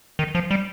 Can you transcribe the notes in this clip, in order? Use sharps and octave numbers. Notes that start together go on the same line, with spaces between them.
D#3
F3
G3